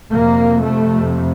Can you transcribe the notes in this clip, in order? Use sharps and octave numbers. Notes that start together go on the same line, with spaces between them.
F2 C3 A#3
A3